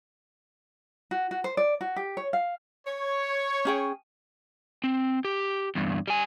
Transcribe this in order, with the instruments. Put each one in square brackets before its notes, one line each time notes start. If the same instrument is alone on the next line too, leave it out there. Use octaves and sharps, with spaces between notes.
[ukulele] F#4
F#4
C5
D5
F#4
G4
C#5
F5
[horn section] C#5
[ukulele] C#4 G#4 G5
[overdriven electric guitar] C4
G4
E2 G2
G3 G#5